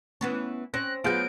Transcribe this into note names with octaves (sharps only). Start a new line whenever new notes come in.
E3 B3 C#4
C4 C#4 F#6 A#6
F#3 B3 F4 G#4 G6 D7